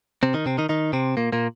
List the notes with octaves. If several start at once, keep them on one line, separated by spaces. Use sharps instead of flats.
C3 C4
D#3 D#4
C3 C4
D#3 D#4
D#3 D#4
C3 C4
A#2 A#3
A#2 A#3